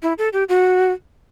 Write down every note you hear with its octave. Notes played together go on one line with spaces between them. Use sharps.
E4
A4
G4
F#4